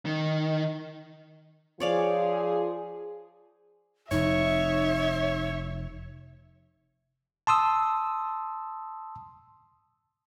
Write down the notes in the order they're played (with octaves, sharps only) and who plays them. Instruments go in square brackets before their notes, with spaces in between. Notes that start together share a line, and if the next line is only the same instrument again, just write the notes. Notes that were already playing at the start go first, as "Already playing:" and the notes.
[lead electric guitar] D#3
[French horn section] F3 G#4 [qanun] C#5 D5 F5
[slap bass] F1 F2 [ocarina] D#4 [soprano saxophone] C#5 [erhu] E5
[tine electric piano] A5 C6 D#6 E6